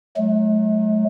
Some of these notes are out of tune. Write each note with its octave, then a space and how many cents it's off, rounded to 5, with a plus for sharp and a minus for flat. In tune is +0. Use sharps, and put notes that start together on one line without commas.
F#3 +0 A3 -40